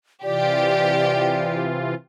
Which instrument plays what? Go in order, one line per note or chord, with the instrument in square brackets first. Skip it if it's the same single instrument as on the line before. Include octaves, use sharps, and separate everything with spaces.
[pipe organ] C3 E3 F4 [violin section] G4 [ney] D5